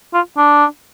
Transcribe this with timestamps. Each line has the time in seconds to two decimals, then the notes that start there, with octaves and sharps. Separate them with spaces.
0.14 F4
0.37 D4